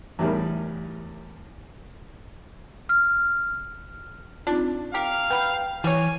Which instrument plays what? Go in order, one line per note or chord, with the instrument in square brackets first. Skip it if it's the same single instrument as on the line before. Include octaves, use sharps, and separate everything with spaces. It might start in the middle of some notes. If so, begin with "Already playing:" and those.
[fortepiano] E2 A2 G3 A#4
[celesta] F6
[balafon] C4 D#4 F4 [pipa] D4
[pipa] G4 A#4 [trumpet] F5
[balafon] B4 F#5 B5 [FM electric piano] G5
[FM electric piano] E3 [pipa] G3 C#5 [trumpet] G#5